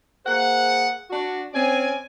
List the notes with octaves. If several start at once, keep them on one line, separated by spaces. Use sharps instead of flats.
A#3 G#4 C5 F#5
D4 F#4
C4 C#4 D5 G#5